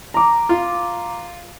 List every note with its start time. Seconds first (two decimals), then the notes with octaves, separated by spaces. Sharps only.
0.14 A#5 D6
0.49 F4